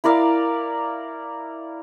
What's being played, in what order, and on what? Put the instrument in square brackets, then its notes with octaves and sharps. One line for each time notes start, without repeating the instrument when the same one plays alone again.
[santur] E4 A#4 D5 F5